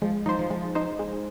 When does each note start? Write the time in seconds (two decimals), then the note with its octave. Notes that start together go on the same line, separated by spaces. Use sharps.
0.02 F3 G#3
0.26 F3 D#4 C5
0.39 F3
0.50 F3 G#3
0.75 D#4 C5
0.99 G#3